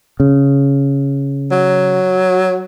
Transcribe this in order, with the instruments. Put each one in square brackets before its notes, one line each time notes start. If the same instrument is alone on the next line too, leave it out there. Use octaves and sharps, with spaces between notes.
[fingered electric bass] C#3
[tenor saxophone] F#3